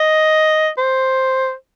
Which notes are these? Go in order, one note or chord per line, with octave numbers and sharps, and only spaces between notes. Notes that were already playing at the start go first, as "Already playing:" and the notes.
Already playing: D#5
C5